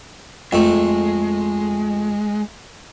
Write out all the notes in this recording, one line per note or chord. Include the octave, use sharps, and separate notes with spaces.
F2 G#3 A3